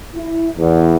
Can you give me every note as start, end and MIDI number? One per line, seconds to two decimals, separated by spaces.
0.16 0.49 64
0.58 0.97 40